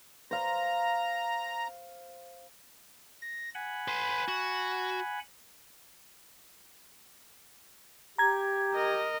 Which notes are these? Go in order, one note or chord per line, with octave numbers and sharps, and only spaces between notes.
C5 F5 A#5
A#6
F#5 G#5 B5
B4 C6
F#4
G4 A#5 G#6
A#4 D#5